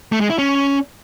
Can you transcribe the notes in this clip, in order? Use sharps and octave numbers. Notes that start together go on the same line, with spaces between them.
A3
G#3
E4
C#4